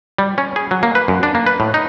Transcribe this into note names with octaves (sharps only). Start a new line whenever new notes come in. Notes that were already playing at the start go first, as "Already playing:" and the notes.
G3
C#4
G#4
F#3
A#3
B4
F#2
D4
A#3
B4
A2
D#4